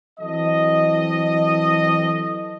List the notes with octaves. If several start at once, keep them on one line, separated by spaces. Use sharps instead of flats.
E3 F#3 C4 A4 D#5